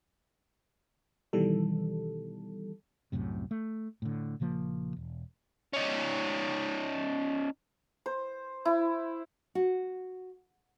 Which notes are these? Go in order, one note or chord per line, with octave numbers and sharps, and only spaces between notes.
B2 D#3 E3 G3 A4
C2 F#2 A2 C3
A3
A2 D3
A#1 C#3 F3 A#3
E1
C#4 D#4
C5
E4
F#4